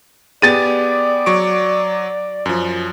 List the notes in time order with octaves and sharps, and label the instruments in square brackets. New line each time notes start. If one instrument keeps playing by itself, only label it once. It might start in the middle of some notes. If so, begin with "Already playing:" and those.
[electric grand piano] B3 G4 G#4 [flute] D5 [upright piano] A6 D#7
[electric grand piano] F#3 C#6 D7
F#2 F3